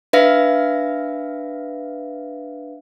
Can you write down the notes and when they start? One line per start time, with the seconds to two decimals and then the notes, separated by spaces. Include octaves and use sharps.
0.13 D4 B4 E5 F5 A#6